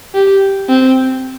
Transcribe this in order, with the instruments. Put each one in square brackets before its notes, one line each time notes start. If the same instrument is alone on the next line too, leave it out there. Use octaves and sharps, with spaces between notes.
[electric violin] G4
C4